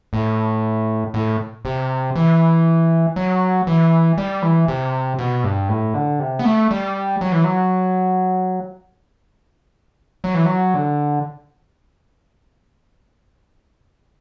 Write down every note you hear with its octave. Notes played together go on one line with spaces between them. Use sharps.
A2
A2
C3
E3
F#3
E3
G3
E3
C3
B2
G2
A2
D3
C3
B3
A3
G3
F#3
E3
F#3
F#3
E3
F#3
D3